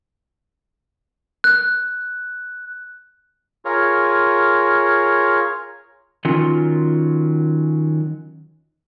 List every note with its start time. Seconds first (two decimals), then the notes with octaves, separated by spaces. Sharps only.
1.44 F#6
3.65 F4 G#4 A#4 C#5
6.25 D#3 F#3 C#4 F4